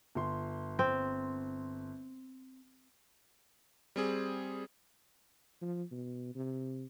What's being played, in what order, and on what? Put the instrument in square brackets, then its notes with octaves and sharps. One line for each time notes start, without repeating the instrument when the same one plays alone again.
[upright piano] G1 C6
[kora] C4
[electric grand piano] G3 C4 G#4
[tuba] F3
B2
C3